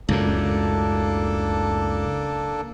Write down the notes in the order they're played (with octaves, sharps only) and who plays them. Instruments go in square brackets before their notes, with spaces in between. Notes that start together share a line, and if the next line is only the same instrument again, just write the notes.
[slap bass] C#2 F#2 A2 [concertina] A#3 D4 A4